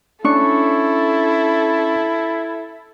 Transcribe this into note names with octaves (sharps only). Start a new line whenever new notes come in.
C#4 D4 E4 A4 C#6 C#7